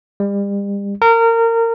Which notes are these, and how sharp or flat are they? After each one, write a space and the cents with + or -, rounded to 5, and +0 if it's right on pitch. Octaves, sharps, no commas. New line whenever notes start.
G3 +35
A#4 -25